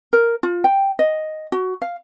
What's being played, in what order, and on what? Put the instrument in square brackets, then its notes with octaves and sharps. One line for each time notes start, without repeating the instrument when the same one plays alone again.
[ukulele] A#4
F4
G5
D#5
F#4
F5